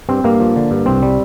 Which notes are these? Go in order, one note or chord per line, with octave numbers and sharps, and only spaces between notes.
G2 C4
G2 A#3
F3
D3
G2
C2 C4
G3